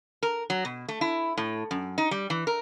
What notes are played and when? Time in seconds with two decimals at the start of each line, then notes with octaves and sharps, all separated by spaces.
0.23 A#4
0.50 F#3
0.65 B2
0.88 A3
1.01 E4
1.38 A2
1.71 F#2
1.98 D#4
2.11 G3
2.30 E3
2.47 A#4